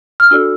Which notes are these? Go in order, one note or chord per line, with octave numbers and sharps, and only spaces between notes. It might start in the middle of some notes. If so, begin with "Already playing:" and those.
F6
D4 F#4 A4 D5 E6